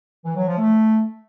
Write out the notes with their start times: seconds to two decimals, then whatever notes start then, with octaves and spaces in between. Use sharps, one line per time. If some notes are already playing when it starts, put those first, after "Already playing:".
0.24 E3
0.35 F#3
0.46 F3
0.58 A3